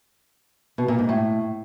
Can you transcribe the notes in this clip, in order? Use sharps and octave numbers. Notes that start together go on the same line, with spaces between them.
B2
A#2
G#2
A2